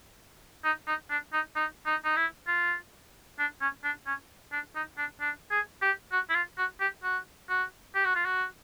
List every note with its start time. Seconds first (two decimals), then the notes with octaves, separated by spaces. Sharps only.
0.64 D#4
0.87 D#4
1.10 D4
1.33 D#4
1.56 D#4
1.86 D#4
2.05 D#4
2.16 E4
2.47 F4
3.39 D4
3.61 C#4
3.84 D4
4.07 C#4
4.52 D4
4.75 D#4
4.98 D4
5.20 D4
5.51 G#4
5.82 G4
6.12 F#4
6.29 E4
6.35 F4
6.58 F#4
6.80 G4
7.03 F#4
7.49 F#4
7.95 G4
8.05 F#4
8.15 F4
8.25 F#4